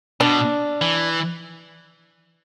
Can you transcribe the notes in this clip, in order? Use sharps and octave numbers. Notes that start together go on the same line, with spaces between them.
B2 D4
E3